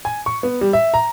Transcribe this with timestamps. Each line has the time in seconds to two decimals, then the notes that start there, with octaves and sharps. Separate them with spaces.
0.05 G#5
0.26 C#6
0.43 B3
0.61 G3
0.73 E5
0.94 A#5